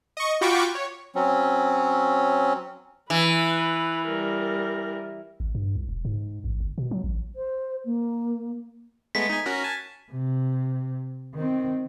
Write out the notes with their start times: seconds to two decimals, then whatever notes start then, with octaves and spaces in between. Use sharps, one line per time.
0.17 D#5 C#6
0.41 F4 F#4 G5 B5 C#6 D6
0.75 C#5
1.15 F#3 C4 C#4
3.10 E3 B4
4.07 G3 A#4
5.40 G#1
5.55 G2
5.75 C2
5.89 E1
6.05 G#2
6.44 A1
6.60 G1
6.78 B2
6.91 F#3
7.04 A1
7.36 C5
7.85 A#3
9.15 G#3 A3 B3 B6
9.29 D#4 G#5
9.46 C#4 F#4 A#4
9.64 G#5 A5
10.11 C3
11.34 D#3 C4